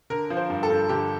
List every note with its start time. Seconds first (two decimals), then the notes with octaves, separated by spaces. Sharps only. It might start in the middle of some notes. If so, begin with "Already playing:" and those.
0.10 D3 A#4
0.30 F3
0.37 C5
0.50 G2
0.63 A4
0.70 G2
0.89 D3 G4